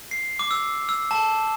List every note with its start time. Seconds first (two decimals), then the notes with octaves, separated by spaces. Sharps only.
0.11 C7
0.39 D6
0.51 E6
0.89 E6
1.11 A5